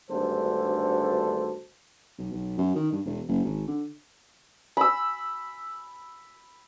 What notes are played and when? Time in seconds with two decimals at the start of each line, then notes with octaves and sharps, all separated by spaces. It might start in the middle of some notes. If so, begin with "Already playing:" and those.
0.10 G#1 D2 G2 A4 C5
2.18 B1
2.33 B1
2.58 F#2
2.76 D#3
2.92 G2
3.06 E1
3.28 F#1
3.45 G#1
3.67 D3
4.77 B5 E6